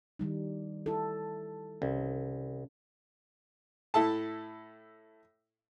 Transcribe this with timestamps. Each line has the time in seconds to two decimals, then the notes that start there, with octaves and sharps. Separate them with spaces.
0.19 D#3 G3 D#4
0.86 E4 A4
1.82 C2 C#4
3.94 A2 E4 A4 A5